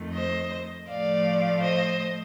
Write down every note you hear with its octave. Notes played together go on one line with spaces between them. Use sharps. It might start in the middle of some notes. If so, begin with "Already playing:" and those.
Already playing: F2 D#3 A3
C5 D#5
A2 F3 A3 D5 F5
C5 D#5